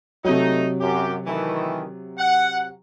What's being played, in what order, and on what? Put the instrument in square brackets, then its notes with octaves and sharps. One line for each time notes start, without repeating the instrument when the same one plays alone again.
[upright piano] C3 F#3 [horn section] A3 D#4
[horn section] F#2 G4
D#3 E3 A3
F#5